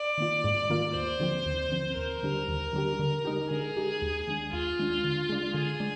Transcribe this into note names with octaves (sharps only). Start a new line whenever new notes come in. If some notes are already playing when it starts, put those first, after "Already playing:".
Already playing: D5
D#3 A#3 F4
G#2
D#3 A#3 F4
D#2 C5
D3 F3 C4
D#2
D3 F3 C4
D#2 A#4
D3 G3 D4 G4
D#2
D3 G3 D4 G4
D3
G#3 D#4 G4
D3 G#4
G#3 D#4 G4
D#2
D#3 G#3 D4
D#2 F4
D#3 G#3 D4
D3
G#3 D4
D3 G#4
G#3 D4